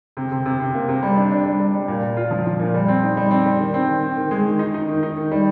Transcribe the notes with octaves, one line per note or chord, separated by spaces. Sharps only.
C3
C3
C3
C3
A#3
C3
G3
D4
D4
G3
G3
G3
A#2
A#2
F4
F3
F3
A#2
G3
C4
D#4
G3
C4
G3
D#3
C4
D#3
C4
D#3
G#3
D#3
D#4
D#4
D#3
D#4
D#3
G3